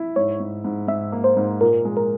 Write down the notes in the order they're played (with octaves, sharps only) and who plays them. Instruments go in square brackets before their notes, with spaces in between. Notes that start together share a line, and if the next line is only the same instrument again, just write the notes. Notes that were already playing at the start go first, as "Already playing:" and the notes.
Already playing: [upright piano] E4
[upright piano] G#2 [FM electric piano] C#5
[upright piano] G#2
G#2
[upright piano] G#2 [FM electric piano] E5
[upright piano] A#3
[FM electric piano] C5
[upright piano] G#2
[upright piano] A#2 [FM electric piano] A#4
[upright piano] G#3
[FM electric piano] A#4